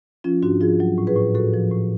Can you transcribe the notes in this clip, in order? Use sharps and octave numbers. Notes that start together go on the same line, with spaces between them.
F3 C#4 F4
G#2 D4 F#4
F3 F4 G#4
F#3
A2
G#4 B4
A2
A2 F#4 A4
F3
A2